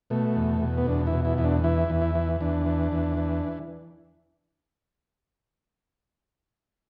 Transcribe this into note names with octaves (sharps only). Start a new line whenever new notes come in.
B2 A3
E2
B2
B3
E2 D4
E4
B2
E4
E2 E4
D4
E3 E4
E2
E4
E3
E2 D4
E3
E2
E3